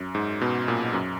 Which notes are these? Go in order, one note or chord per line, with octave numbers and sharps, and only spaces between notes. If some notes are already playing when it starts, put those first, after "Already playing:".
Already playing: F#2
G#2
B2
A#2
F#2